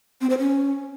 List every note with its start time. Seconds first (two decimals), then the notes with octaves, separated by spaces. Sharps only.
0.21 C4
0.30 C5
0.38 C#4